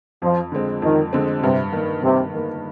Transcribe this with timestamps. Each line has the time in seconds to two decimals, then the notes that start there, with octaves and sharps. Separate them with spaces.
0.22 F2 F3
0.52 D3 G#3 C4
0.82 F2 D#3
1.13 D3 G#3 C4
1.42 G2 C3
1.73 D#3 A#3
2.03 G2 C3
2.34 D#3 A#3